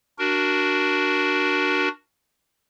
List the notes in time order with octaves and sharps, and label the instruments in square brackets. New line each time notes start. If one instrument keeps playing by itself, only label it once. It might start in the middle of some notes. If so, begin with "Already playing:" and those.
[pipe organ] D4 F#4 A#4